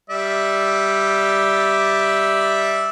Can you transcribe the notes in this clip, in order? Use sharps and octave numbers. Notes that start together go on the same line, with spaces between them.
G3 D5 E5